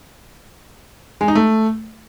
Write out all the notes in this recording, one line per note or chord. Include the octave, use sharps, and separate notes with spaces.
G#3
D#4
A3